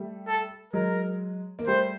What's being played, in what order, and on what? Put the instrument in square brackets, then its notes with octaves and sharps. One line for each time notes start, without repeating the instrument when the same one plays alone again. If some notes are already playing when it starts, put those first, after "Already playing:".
Already playing: [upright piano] G3 A3
[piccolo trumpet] A4
[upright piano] F#3 G#3 [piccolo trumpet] A#4
[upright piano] A#3
[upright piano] G3 A3 [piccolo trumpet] C5